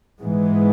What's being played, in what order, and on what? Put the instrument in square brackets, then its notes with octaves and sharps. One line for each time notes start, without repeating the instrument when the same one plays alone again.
[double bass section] G#2 E3 G#3 B3